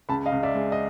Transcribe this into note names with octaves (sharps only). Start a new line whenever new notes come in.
C#2 A5 B5
D#5 F5
C#2
D5 E5
G#3
D#5